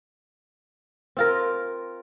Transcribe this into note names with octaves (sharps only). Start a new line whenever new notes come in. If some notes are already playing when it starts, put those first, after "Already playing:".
C4 F4 A#4